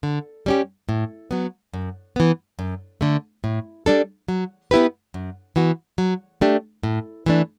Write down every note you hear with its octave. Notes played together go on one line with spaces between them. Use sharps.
D3
G3 C#4 G4
A2
F#3 B3
F#2
E3 B3
F#2
D3 A3
A2
G3 D4 A4
F#3
B3 E4 G4 B4
F#2
E3 B3 F#4
F#3
A3 D4 G4
A2
E3 A3 D4